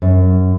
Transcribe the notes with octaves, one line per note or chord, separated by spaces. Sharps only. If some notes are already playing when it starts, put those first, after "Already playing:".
F#2